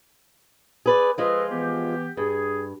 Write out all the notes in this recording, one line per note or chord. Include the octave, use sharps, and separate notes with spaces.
G#4 B4 D5
F3 G#3 F4 A4 B4 D#5
E3 B3 G4
G2 G#4